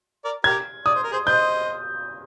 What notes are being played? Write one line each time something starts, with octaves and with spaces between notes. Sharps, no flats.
A#4 D5
G4 A#4 G#6
D5 D#6
C5
A#4
G#4 C5
C5 D#5 G6